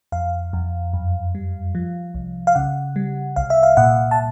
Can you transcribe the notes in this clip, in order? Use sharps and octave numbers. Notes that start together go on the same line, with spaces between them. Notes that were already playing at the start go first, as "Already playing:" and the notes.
F2 F5
F2
F#2
G3
F3
C2
F5
C#3 F#5
G3
C2 F5
E5
F5
A#2 F#5
A5